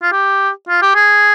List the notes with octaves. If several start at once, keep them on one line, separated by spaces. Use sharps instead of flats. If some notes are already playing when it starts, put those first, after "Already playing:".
F4
G4
F4
G4
G#4